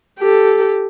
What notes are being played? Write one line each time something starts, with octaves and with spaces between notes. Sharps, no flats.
G4 A4